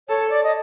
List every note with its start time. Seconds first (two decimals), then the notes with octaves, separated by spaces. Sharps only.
0.08 A4 C#5
0.30 D5
0.44 D#5